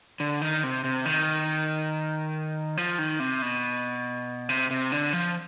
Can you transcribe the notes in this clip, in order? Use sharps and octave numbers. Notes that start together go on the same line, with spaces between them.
D3
D#3
C3
C3
D#3
F3
D#3
C3
B2
C3
C3
D3
F3